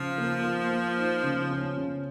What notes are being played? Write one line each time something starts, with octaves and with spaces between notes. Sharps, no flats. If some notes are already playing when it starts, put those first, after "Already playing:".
Already playing: C#3 F3
A#3
A#3
A#3
D#4
C#3
C#4
C#3